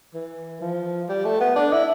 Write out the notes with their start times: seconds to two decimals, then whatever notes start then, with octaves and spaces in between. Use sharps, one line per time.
0.14 E3
0.61 F3
1.09 G3
1.25 A3
1.40 B3
1.56 D4
1.72 E4